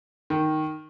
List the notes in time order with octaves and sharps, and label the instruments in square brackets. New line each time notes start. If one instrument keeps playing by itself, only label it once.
[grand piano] D#3